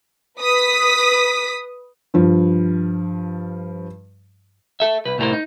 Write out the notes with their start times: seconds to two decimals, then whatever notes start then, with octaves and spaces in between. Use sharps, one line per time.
0.40 B4 D#6 B6
2.14 G2 F3
4.80 A4 E5
5.06 C2 B4
5.18 C2 A2 G3 G4 A#4 C5
5.33 D#4